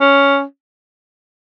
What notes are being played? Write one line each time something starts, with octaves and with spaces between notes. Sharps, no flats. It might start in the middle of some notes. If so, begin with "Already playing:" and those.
C#4